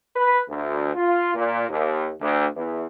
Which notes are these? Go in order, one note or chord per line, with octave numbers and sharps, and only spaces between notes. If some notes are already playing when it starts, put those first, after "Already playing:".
B4
D2
F4
A#2
D#2
D2
E2